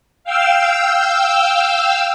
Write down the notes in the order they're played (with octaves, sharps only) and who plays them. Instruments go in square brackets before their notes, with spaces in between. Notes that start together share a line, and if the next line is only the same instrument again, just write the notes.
[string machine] F5 G5 E6